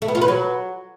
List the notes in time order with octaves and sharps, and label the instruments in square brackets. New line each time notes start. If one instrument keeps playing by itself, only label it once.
[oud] A3
B3
F4
B4
F#3